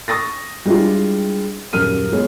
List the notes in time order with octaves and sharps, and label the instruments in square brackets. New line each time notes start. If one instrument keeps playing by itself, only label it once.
[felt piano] C#6 D#6 A6 A#6
G3 G#3 D4 E4 F4
D#1 F#2 A#4 F6 D#7
G#3 B3 C#5